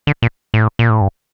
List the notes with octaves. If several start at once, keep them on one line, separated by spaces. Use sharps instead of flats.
D3
A#2
A2
A#2
A2
G2